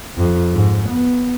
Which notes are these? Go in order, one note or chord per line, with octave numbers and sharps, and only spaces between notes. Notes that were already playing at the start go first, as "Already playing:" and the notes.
F2
G#2
B3